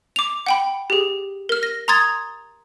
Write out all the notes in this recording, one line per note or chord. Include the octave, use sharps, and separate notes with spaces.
D6 F7
F#5 G5 B5
G4 G#4
A#4 F6
A#6
A#5 C6 D#6 G#6 A6